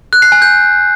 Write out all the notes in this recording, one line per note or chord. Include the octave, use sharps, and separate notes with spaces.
F#6
C7
G#5
G6